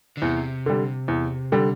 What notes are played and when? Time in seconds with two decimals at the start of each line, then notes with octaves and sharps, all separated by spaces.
0.17 D3
0.22 E2 C3
0.66 D3 G3
1.08 E2
1.52 D3 G3